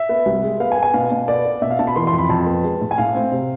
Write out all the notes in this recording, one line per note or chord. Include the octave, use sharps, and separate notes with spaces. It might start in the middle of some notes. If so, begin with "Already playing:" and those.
Already playing: E5
B3
C2
G#3
B3 F5
G#5
B3
G#5
B2 F5
B2
B3 D5
B3
B2 E5
F5
B2 A5
B5
E3 C6
C6
F2
B5
F2 A5
B3
G#3
A2
G#5
A2 F5
C4
C3